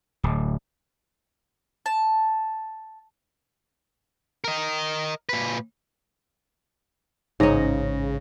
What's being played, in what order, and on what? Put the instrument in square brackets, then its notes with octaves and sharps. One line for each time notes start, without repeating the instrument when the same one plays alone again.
[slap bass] D1
[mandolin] A5
[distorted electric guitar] A#4 D#5
A#2 B4
[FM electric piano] A1 A#6 [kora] G#2 C#4 [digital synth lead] C#3 [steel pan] D#4